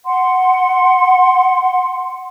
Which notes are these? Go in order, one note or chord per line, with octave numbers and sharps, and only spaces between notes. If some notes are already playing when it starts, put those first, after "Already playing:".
F#5 C6